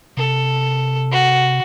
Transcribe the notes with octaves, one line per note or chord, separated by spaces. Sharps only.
C3 A4
F#4